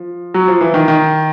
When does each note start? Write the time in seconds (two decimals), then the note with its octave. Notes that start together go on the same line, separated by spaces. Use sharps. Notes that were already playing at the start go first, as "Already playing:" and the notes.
Already playing: F3
0.34 F#3
0.48 F3
0.61 E3
0.74 D#3
0.88 D#3